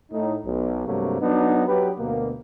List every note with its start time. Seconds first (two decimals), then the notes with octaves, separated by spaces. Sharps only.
0.11 A2 D#4
0.45 B1
0.86 G2 C3 F#3 A3 A#3
1.21 F#3 B3 D4 D#4
1.67 F#3 G4 B4
1.98 D2 B2 A#3